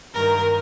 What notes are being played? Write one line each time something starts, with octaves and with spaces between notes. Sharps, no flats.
G2 D#3 A#4